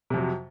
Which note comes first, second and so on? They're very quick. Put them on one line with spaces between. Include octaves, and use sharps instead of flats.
C3 F2 F#3